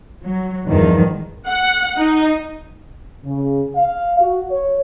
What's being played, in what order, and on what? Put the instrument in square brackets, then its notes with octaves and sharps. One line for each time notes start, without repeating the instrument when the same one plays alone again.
[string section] F#3
E2 G2 D#3 F3
[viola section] F#5
D#4
[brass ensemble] C#3
F5
F#4
C#5